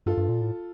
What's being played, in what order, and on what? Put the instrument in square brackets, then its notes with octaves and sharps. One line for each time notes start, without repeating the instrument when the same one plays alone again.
[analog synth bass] G2 [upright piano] F4 A4
[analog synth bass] G2
A#2
A2